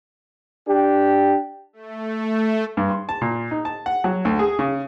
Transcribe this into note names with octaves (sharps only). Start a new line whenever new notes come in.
D4 G4
A3
G2
C6
A5
A#2
D#4
A5
F#5
F#3
D2
G#4
C#3